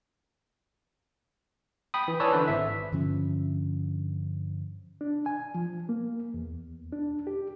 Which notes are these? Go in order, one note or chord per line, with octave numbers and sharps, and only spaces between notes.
G5 B5 D#6
E3
B4 C#5 D5 G#5 A5 E6
D3 E3 B4 C5
G#1 E5
G2 D3 F3 C#4
D4
G#5
F3
A#3
E2
D4
G4